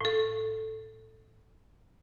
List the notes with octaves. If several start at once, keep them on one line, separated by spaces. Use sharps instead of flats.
A2 A4